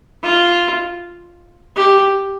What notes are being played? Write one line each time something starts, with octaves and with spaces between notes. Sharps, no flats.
F4
G4